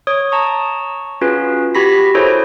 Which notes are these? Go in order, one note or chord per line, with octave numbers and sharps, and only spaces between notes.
C#5 D#6
A5 A#5 C#6
C#4 F4 F#4 G#4 B4
F#4 G4 B5 A#6 B6
E4 G#4 A4 C5 C#5